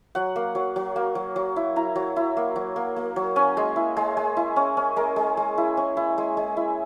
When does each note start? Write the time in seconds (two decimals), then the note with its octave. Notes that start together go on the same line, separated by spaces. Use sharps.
0.15 F#3 F#5
0.36 A#3
0.55 F#3
0.76 F#3
0.96 A#3
1.15 F#3
1.36 F#3
1.56 E4
1.76 E4 A#5
1.96 F#3
2.16 E4
2.37 A#3
2.56 F#3
2.76 A#3
2.96 A#3
3.16 F#3
3.36 C#4 G#5
3.57 G#3
3.76 E4
3.97 G#3
4.17 G#3
4.37 E4
4.56 C#4
4.77 C#4
4.96 G#3 A#4
5.16 G#3
5.37 G#3
5.58 E4
5.77 C#4
5.97 E4
6.18 G#3
6.37 G#3
6.57 E4